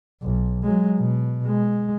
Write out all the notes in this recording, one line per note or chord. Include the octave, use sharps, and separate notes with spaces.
B1
F#3 G#3
B2
G#3